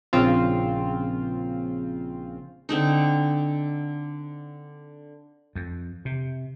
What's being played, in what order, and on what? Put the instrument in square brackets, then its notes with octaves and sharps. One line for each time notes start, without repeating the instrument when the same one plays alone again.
[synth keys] A#1 C#3 C4 F4
[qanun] D3 C4 D#4
[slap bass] F2
C3